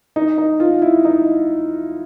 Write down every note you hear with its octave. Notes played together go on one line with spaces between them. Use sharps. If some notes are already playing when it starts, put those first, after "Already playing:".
D#4
D#4
F4
E4
D#4